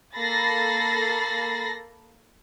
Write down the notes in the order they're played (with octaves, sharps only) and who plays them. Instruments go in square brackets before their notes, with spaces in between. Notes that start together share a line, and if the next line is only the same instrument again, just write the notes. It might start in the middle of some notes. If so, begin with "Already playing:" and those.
[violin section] A#3 A4 B5 A6 A#6 C7